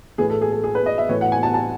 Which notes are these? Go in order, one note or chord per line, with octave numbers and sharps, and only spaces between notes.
A2 E3 G#4
A4
G#4
A4
G#4
B4
D#5
E5
A2 E3 C#5
F#5
G#5
A5
A5